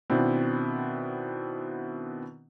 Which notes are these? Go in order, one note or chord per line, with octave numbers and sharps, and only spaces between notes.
B2 D#3 B3 C4 D4 E4